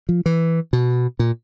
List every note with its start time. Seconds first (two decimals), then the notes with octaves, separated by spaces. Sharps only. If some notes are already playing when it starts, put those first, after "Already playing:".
0.09 F3
0.26 E3
0.73 B2
1.19 A#2